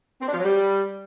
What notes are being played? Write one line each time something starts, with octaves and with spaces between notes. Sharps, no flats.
C4
D4
F3
F#3
G3